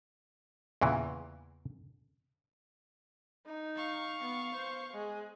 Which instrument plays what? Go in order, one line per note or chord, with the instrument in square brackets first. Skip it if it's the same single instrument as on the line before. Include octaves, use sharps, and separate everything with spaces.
[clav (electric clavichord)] E2 A#2 C#3 E3
[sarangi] D#4
[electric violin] F5 C#6
[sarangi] B3
C5
G#3